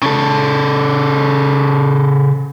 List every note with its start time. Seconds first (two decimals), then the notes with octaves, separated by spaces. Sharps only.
0.02 C#3 A4